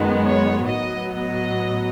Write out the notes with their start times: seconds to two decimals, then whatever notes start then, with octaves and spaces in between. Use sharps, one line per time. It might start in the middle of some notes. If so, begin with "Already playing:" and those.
Already playing: F#2 D#3 G#3 B3
0.26 C#5
0.68 A2 F#3 B3 D#5
1.11 D#5